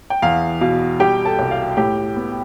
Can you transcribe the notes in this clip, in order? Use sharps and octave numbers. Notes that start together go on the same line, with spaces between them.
G5
E2 F5
B2 F5
G3 G4 G5
A4 A5
C2
F5
A2 G4 G5
B3